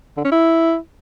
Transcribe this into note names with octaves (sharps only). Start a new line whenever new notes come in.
D3
C#4
E4